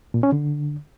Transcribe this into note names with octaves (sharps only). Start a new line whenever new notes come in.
A#2
C#4
D3